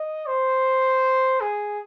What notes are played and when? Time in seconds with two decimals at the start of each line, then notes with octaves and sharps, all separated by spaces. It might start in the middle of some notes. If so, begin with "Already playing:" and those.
Already playing: D#5
0.27 C5
1.41 G#4